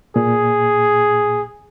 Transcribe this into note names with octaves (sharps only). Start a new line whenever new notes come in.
A#2 G#4